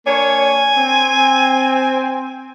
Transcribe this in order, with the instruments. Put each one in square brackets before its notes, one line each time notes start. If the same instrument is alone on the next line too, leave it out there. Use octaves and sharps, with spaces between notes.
[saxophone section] A#3 D4 C#5 [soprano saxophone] G#5
[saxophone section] C4